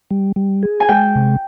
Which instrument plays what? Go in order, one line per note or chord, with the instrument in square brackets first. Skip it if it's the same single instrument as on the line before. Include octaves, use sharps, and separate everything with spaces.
[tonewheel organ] G3
G3
G#4
[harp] G#5
[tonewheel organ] G#3 [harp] G5
[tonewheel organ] C3